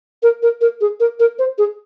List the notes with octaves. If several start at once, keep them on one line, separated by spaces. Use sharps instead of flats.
A#4
A#4
A#4
G#4
A#4
A#4
C5
G#4